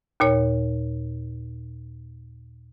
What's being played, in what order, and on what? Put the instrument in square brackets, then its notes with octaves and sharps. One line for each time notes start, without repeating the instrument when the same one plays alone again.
[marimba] D#2 A#2 C#5